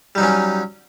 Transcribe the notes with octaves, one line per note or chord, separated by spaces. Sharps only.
F#3 G3 C#4 D#4